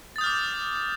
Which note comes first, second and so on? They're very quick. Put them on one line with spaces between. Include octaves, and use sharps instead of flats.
A6 D#6 G6 F6 D6